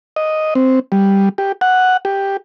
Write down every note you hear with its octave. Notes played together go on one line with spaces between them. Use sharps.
D#5
C4
G3
G4
F#5
G4